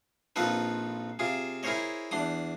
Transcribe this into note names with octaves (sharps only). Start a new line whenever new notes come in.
A#1 C4 D#4 F4 A4 B4
C3 F4 G#4
E4 G#4 A#4 C5 C#5 D#5
E2 D4 C6 D#6